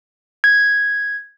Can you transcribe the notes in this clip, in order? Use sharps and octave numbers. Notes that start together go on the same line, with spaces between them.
G#6